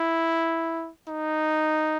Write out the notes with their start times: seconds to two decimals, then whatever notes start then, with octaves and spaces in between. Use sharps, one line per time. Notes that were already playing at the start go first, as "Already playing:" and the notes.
Already playing: E4
1.08 D#4